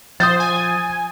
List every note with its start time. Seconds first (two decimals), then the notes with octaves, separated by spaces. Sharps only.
0.20 F3 C5 D#6 G6 A6
0.40 G#5